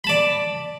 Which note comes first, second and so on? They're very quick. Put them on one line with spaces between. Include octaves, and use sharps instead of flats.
B5 A5 D5